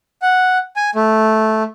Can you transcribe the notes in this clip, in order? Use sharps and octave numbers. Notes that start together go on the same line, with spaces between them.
F#5
G#5
A3